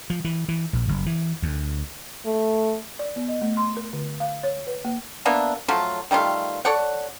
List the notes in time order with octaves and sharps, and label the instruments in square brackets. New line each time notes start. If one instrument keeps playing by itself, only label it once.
[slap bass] F3
E3
E3
A#1
F#1
E3
D2
[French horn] A3
[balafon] D5
B3
D#5
A3
C6
A#4
D3
F5
C#5
B4
A#3
[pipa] A#3 B3 D4 E5
F3 F#3 A3 F4
D#3 G3 A3 F4
A4 C#5 D5 F#5